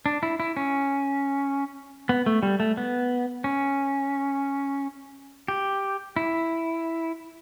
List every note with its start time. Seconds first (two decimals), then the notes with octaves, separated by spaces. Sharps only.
0.06 D4
0.23 E4
0.40 E4
0.57 C#4
2.09 B3
2.26 A3
2.43 G3
2.60 A3
2.77 B3
3.44 C#4
5.48 G4
6.16 E4